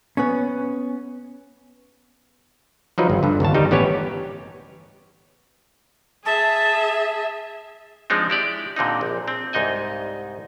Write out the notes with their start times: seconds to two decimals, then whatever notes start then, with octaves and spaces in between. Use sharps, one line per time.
0.17 B3 C#4
2.98 F3 F#3 D#4 B4
3.10 G1
3.23 G2 D3
3.40 G1 D#2 C#5 A5
3.54 D#3 G3 D#4
3.71 A1 B3 G4 C#5 G#5
6.25 G#4 E5 A5
8.10 F3 G#3 C4 D4 D#4
8.30 E4 G4 D5
8.76 A#2 D3 C4 D#4
9.01 A#1
9.28 C4
9.53 C2 G#2 D#4 D#5 G#5